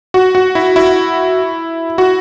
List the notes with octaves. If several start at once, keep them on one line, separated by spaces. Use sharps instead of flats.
F#4
F#4
E4
E4
F#4